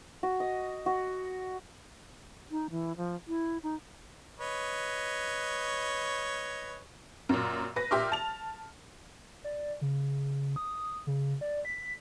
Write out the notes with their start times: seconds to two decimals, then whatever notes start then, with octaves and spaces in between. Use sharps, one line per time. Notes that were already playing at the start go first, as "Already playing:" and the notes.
0.23 F#4
0.40 D#5
0.86 F#4
2.51 D#4
2.71 E3
2.97 F3
3.28 E4
3.63 D#4
4.39 B4 C#5 D#5
7.29 F#2 A#2
7.76 B4 A#6
7.91 A#2 G4 E5 C6 D6 F6
8.12 A5 F7
9.44 D5
9.81 C#3
10.56 D#6
11.07 C#3
11.41 D5
11.65 B6